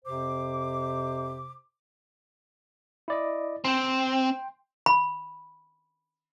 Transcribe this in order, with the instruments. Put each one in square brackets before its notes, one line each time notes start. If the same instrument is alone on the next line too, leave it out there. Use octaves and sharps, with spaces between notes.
[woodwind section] F2 C3 C5 D6
[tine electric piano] E4 D5 D#5
[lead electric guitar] C4 [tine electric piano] G5 C6
[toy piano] B5